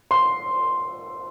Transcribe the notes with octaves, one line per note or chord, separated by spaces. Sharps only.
C6